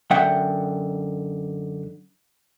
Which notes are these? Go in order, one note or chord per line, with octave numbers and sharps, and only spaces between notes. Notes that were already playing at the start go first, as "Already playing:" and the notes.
F#2 D3 E5 F#5 G5